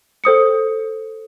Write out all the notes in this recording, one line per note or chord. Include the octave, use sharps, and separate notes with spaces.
A4 C5 D#6 C#7